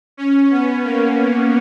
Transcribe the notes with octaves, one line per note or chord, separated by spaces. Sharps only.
C#4
B3
A#3